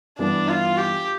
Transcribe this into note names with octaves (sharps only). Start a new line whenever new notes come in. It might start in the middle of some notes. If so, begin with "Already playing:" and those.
G2 E3 B3 D4
F4
G4